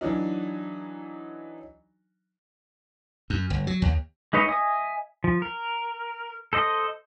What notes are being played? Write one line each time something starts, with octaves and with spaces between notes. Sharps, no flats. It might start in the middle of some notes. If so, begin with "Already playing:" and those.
E3 F#3 D4 D#4
F#2
G1
F#3
D#2
G#3 D#4 B4 C#5 D#5
D#5 E5 G#5 D#6
F3
A#4
A4 C5 D#5